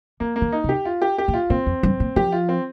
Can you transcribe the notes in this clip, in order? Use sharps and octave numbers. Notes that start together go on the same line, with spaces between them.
F3 A#3
A#3
D#3
D#4
C3
G4
F4
G4
G4
A#2
F4
A#2 C4
F2
G2
A#2
F3 G4
F4
C4